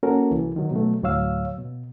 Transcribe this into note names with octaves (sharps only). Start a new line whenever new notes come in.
A#3 C#4 F#4 A4 A#4
C2 E3
D#3 F#3
B2 F#3 A3
D2 A2 F#3 C#5 F5 E6
B2